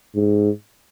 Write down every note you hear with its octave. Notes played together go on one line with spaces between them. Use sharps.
G#2